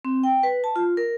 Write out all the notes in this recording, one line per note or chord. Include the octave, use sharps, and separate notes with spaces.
C4
G5
B4
A5
F4
A#4